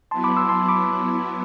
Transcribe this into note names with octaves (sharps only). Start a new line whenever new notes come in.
F#3 B3 E4 A5 C6
B5 D6
C6 E6
A5 C6
B5 D6